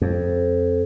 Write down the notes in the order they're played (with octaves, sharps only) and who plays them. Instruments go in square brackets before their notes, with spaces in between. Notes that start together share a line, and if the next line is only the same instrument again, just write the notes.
[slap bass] F2